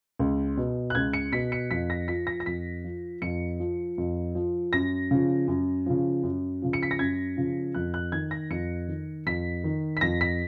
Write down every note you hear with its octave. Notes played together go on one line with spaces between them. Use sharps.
C#2
B2
F#6
C#2 G#6
C#7
B2 B6
C#7
F2 B6
A#6
F3 B6
A#6
A#6
F2 B6
F3
F2 C#7
F3
F2
F3
F#2 A#6
C#3 F3
F#2
C#3 F3
F#2
C#3 F3
C#7
B6
A#6
F#2 G#6
C#3 F3
F2 F#6
F#6
D#3 G#6
A#6
F2 C#7
D#3
F2 B6
D#3
B6
F2 A#6
B6